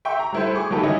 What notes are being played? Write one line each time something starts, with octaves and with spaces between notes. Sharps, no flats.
E5 G5 C6 C#6
A#5
G3 A3 E4 B4 C5
G#4 C#6 D6
F#3 A#3 D#4 G4 A4 B4
E3 G3 C#4 D#4 E4 D#5